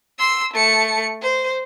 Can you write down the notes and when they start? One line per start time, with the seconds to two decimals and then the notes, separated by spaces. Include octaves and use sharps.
0.18 C6 E6
0.53 A3 C#7
1.22 C5